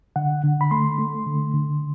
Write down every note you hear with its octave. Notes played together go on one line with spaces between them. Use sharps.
D3 F#5
D3
B5
A3 C6
A3
D3
D3